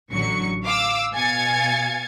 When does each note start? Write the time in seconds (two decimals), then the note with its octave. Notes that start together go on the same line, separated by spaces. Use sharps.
0.12 A1 D3 F#3 C#6 C#7
0.64 F5 D6 E6
1.13 B2 F5 G#5 G#6 A6 C#7